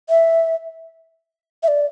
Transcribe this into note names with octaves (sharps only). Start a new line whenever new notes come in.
E5
E5
D5